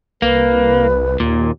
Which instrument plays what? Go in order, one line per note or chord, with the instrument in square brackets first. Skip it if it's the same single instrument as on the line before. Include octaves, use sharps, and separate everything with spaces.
[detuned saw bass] C2 [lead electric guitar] A#3 [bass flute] B4
[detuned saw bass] D#2 [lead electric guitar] A#2